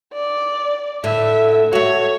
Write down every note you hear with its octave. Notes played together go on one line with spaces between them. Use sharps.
D5
A2 D3 E5
A3 F#4 C#5